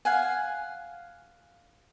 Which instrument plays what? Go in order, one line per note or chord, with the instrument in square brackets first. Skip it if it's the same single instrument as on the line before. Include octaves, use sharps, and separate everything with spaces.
[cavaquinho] F5 F#5 G#5